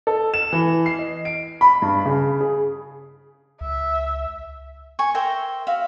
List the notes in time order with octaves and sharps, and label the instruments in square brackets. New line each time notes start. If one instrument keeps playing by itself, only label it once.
[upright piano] A4
E7
E3
C7
D#5
D7
B5
G2
C#3
G#4
[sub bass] C#2 [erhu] E5
[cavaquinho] G#5 C#6
A#4 C5 E5 G5
F#4 E5 F5